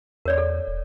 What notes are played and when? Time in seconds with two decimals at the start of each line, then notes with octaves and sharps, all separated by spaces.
0.25 E2 A#4 C#5 D5
0.38 A4
0.68 D#1